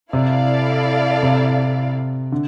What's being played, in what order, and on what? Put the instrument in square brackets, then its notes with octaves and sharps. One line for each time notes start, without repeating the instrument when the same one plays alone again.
[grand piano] C3 [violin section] E4 A4 D5 F5
[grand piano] C3
D3